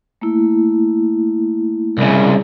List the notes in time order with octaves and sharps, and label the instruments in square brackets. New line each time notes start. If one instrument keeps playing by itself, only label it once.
[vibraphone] A3 A#3 E4
[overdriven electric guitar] C2 C#3